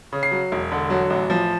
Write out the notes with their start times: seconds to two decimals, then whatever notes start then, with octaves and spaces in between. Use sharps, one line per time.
0.12 C#3
0.23 C7
0.31 F#3
0.52 E1
0.71 D3
0.90 F#3
1.10 A1
1.30 F3